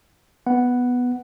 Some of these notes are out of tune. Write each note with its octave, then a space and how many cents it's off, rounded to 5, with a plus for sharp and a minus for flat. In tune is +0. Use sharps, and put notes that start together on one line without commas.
B3 +0 F#5 +0